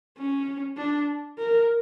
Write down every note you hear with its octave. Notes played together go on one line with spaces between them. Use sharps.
C#4
D4
A#4